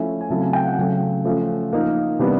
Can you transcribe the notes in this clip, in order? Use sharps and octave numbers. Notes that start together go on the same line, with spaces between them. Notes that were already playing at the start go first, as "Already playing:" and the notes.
Already playing: F3 A3 C#4 E4
G#5
C#3 F#3 A3 C4 E4 A5
G#5
G5
F#5
C#3 F#3 A3
F3 A3 C#4
F3 A#3 D#4 F5
C3 E3 G3 B3 D4